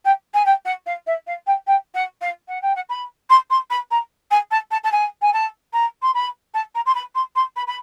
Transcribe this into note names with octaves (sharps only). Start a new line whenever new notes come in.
G5
G#5
G5
F#5
F5
E5
F5
G5
G5
F#5
F5
F#5
G5
F#5
B5
C6
C6
B5
A#5
G#5
A5
A5
A5
G#5
G#5
A5
A#5
C6
B5
A5
A#5
C6
B5
C6
C6
B5
B5